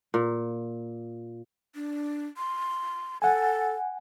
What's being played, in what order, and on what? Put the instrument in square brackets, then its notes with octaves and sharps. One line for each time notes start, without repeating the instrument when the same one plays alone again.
[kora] A#2
[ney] D4
C6
[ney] A4 [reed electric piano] F#5 G#5